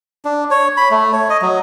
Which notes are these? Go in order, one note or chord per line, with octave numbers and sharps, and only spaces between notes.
D4
C#5
B5
A3
C#5
D#5
F#3